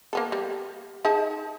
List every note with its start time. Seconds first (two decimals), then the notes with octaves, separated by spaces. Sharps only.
0.13 A#3 B3 A4
0.32 G3
1.05 D#4 G#4 A5